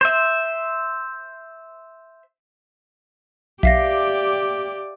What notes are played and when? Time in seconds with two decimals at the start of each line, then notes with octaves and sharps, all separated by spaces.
0.01 C5 E5
3.63 B1 G4 D5 E5 F5 A#6